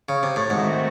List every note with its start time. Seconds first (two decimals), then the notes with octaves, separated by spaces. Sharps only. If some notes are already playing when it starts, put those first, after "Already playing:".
0.09 C#3
0.23 C3
0.36 A2
0.49 G#2 D#3 A3 C4 F#4